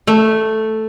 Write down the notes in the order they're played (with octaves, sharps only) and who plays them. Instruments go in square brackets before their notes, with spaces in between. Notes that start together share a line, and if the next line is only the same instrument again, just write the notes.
[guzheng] A3